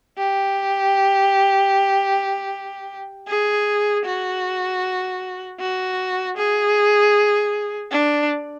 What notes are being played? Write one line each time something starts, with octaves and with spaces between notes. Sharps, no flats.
G4
G#4
F#4
F#4
G#4
D4